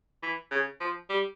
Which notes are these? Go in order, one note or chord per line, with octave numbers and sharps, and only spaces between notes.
E3
C#3
F3
G3